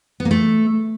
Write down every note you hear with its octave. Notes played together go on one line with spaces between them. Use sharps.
B3
A#3
A3